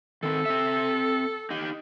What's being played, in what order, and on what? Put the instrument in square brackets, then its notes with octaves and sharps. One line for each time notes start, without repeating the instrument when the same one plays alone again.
[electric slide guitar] D#3 C4 [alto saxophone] A4
[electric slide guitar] C4 E5
D#4 G4